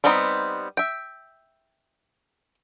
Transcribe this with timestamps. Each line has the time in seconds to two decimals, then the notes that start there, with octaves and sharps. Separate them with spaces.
0.04 G3 B3 C4 D#4 B5
0.77 E5 G5